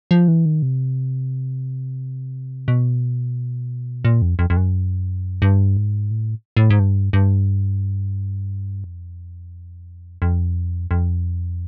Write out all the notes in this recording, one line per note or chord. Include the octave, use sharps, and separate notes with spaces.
F3
E3
D#3
C3
B2
A#2
F2
F2
F2
F#2
G2
G#2
A2
A2
G#2
G2
G2
F2
F2
F2